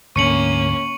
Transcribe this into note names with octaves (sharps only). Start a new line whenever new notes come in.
D2 G#2 D3 A#3 C#4 C#6 C#7 F#7